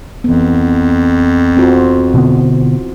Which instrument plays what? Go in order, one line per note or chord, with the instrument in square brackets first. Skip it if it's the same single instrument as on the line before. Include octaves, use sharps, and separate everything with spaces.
[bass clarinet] F2 [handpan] E3 B3
[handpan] C4 F4 F#4
[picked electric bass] B2 D3 B3 [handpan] E4